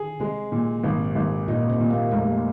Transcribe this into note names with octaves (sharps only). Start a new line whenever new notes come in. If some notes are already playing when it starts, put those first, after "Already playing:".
Already playing: G#4
C3 G#3
A#2
G#1 C3
G#1
A#2 D#4
C3
A#2
A#3
F1 G#3